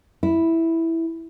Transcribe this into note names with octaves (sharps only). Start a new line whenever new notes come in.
E4